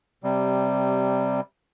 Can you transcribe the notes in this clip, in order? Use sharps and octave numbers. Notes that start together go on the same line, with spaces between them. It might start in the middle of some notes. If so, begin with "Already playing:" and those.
C3 G3